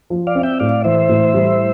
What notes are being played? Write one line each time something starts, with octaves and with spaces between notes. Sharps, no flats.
F3
D5 F5
C4
E5 G5
A2 D5 F5
E3 C5 E5
A2
G3